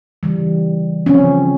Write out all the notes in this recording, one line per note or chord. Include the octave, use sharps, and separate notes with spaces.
C#3 E3 G3
C#3 F3 C4 C#4